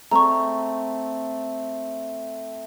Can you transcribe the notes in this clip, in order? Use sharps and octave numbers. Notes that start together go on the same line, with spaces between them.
A3 C4 A#5 C#6